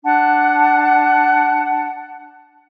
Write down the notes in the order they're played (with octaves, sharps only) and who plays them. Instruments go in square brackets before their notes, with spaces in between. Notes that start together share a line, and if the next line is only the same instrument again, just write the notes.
[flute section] D4 F#5 A5